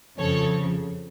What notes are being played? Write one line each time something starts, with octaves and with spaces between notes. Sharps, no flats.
F2 C#3 F3 A4 C#5